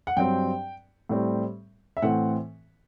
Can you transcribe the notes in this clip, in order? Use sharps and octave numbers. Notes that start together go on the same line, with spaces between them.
F#5
G2 F#3 C4 G5
A2 G3 C4
E5
A2 E3 A3 C4 F#5